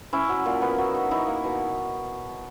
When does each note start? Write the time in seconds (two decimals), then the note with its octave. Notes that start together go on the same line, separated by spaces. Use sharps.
0.13 C#4 E4
0.29 F#3
0.46 A#2
0.62 B3
0.78 F#3
0.95 D#4
1.11 D#4 E4
1.27 A#3
1.44 B2